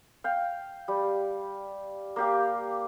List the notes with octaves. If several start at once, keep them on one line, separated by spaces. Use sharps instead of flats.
F5 G5
G3
A#3 G4 F5